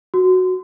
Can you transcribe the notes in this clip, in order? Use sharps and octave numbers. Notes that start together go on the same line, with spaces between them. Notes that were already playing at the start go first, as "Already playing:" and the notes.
F#4